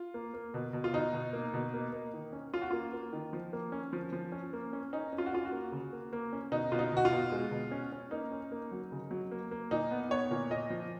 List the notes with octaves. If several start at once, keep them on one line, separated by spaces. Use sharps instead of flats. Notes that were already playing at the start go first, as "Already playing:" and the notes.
Already playing: F4
A#3
A#3
B2
B2
F4
B2 D#4
B2
A#3
B2
A#3
A#3
D#3
C#4
C#4 F4
F#4
A#3 F4
A#3
D#3
F3
A#3
C#4
F3
F3
C#4
A#3
C#4
C#4 D#4
C#4
F4
F#4
C#4 F4
F#4
A#3
C#3
A#3
A#3
C#4
B2 D#4
B2 F4
D#4
B2 F#4
F4
B2
G#3
B2
C#4
C#4
A#3 D#4
C#4
A#3
F#3
C#3
F#3
A#3
A#3
A#2 D#4
B3
B3 C#5
A#2
A#2 D#5
F3